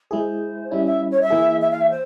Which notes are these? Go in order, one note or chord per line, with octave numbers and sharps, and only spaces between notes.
G#3 E4 G#4 C5
G3 C#4 E4 E5
E5
C#5
E5
E3 A#3 E4 G#4
E5
F5
E5
C5